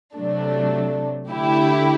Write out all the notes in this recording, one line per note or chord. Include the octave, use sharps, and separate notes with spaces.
C3 F#3 A3 D4
D3 A3 E4 G4